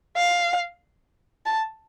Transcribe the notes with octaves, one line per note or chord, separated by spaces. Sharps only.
F5
A5